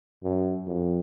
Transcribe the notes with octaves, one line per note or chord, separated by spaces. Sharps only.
F#2
F2